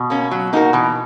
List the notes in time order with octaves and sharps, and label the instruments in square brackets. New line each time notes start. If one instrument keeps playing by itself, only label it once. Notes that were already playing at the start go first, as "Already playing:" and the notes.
Already playing: [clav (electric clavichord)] B2
[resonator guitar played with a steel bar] A#3 C#4
F#3
A#3 D#4 F#4 A#4
[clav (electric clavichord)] B2 [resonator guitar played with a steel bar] E3